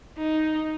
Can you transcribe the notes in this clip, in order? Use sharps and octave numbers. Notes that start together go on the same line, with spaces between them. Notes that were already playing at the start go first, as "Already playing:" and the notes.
D#4